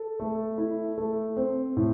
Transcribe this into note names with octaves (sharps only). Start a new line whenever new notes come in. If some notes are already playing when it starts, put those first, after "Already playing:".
Already playing: A4
A3
E4
A3
C4
A2